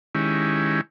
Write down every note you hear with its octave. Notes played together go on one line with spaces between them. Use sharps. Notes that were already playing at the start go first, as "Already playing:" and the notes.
D#3 G#3 C#4 E4 G4